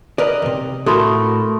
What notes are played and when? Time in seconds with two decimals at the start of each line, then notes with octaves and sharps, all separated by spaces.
0.18 A#4 B4 D5 D#5
0.42 D#2 C3
0.86 A2 A3 F#4 A4 A#4 B5 C6 D#6